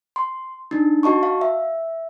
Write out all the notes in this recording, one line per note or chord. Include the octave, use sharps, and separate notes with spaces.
C6
D4 D#4
F#4 D#5 A5 C#6
F5
E5